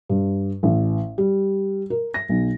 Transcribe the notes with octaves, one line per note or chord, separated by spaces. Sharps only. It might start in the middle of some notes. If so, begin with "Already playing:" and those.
G2
A1
G3
A#4
A#6
B1